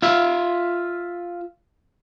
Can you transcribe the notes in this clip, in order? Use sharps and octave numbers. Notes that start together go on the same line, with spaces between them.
F4 E5